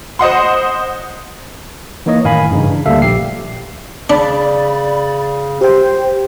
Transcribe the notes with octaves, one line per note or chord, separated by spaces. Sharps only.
C5 D#5 F#5 C6
E3 A#3 D#4 C#5 D#5
F#2 A2 D#3 F5 G#5 B5
G2 C#3 E3 D#4
D4
D2 G3 A#3 A4 E5 F5
A#1 G4 C7
C#3 D4 D5 B5 A6
G4 C5 G5